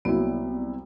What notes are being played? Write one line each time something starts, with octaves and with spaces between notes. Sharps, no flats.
C2 F#3 A#3 B3 E4